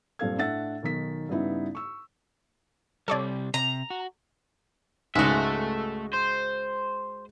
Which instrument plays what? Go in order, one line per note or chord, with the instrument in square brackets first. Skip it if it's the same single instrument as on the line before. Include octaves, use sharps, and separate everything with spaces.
[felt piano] G2 A#2 C4 A4 F5 G#6
A2 D4 E5 F#5 E6 A6
B1 D#3 B6
G2 C#3 B3 D#4 E4
C#6 E6
[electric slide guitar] C3 G3 [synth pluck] A4 C#5 D5
[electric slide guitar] C3 [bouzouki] A#5
[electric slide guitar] F#4
[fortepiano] C#2 G#2 [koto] G#3 F#4 [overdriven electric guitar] A3 E5
[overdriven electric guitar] C5